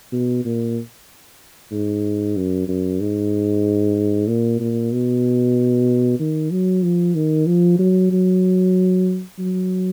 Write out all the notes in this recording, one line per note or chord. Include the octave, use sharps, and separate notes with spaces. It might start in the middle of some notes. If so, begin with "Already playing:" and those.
B2
A#2
G#2
F#2
F#2
G#2
A#2
A#2
B2
D#3
F#3
F3
D#3
F3
F#3
F#3
F#3